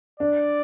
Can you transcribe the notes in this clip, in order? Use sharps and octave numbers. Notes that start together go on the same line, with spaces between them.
D4 D5